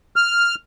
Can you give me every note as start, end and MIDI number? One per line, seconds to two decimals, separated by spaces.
0.16 0.55 89